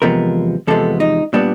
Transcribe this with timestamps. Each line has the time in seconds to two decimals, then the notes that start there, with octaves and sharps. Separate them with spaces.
0.02 E2 C3 F3 G#3 B3 A#4
0.67 E2 C3 F3 G#3 B3 A4
1.00 D#4
1.33 A#2 G3 B3 D4